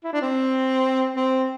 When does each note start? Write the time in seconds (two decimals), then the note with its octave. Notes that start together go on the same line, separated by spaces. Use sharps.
0.04 E4
0.13 D4
0.22 C4
1.16 C4